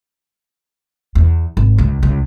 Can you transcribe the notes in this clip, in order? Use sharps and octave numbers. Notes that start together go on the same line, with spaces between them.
E2
G#1
C#2
C#2